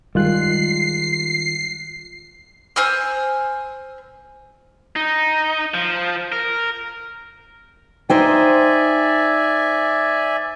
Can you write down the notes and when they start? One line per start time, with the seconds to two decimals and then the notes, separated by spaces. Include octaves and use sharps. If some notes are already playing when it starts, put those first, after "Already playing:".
0.15 D#3 G3 G#3 F4 F#6 C7
2.76 C5 G#5 E6 F6
4.96 D#4
5.74 F3
6.32 A#4
8.10 D#4 C5 D5 E5 G5 G#5